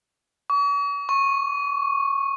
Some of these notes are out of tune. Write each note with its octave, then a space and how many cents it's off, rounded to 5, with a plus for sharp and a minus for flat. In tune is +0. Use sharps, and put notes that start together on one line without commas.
C#6 +45
C#6 -15